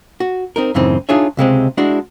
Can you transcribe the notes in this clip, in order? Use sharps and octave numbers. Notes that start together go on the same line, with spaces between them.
F#4
C4 D#4 A#4
F#2 A2 C#3 E3 C4 D#4
D4 D#4 F4 G#4 C#5 E5
C#2 C3 G#3 C4
G#3 D4 E4 F#4